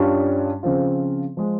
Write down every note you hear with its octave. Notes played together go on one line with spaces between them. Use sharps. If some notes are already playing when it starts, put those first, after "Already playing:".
Already playing: G2 G3 C#4 F4
C#3 F3 C4 F4
F3 G#3